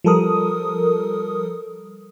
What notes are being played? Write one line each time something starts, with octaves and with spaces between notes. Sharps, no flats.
F3 G3 A4 A#4 D#6